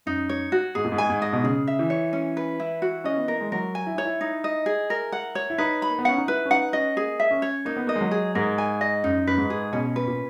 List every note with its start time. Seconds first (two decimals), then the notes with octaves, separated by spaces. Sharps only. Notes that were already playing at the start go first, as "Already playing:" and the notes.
0.06 F#2 D#4
0.29 C#5
0.52 F#4
0.75 G#2 G#4
0.84 A#2
0.92 G#2
0.98 G#5
1.10 G#2
1.22 D#5
1.33 B2
1.44 C#3 G#4
1.67 E5
1.79 E3
1.90 C#5
2.13 C#4
2.37 B4
2.60 E4
2.82 F#4
3.04 C#4 D#5
3.16 B3
3.28 A#3 A#4
3.40 G#3
3.52 F#3 A#4
3.75 G#5
3.87 E4
3.95 D#4 C#5
4.05 E4
4.21 D#4
4.44 D#5
4.66 G#4
4.90 A#4
5.12 F#5
5.35 C#5
5.50 E4
5.58 D#4 B4
5.82 B5
5.90 A#3
5.99 B3
6.05 C#4 F#5
6.18 D#4
6.27 E4 B4
6.46 C#4
6.50 D#4 F#5
6.73 C#4 D#5
6.96 A#3 G#4
7.20 E5
7.31 C#4
7.42 C#5
7.65 A#3 D#4
7.77 B3
7.87 A#3 D#5
7.96 G#3
8.01 F#3
8.11 G#4
8.35 G#2 A#4
8.58 G#5
8.81 D#5
9.03 F#2 D#4
9.27 F#2 B4
9.38 G#2
9.50 G#4
9.72 B2 C#4
9.96 B4
10.07 A#2